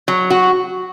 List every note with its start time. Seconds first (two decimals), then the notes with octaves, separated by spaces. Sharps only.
0.08 F#3
0.30 F#4